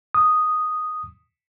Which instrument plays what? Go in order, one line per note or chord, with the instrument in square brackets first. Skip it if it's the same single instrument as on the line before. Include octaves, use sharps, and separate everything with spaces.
[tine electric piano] D#6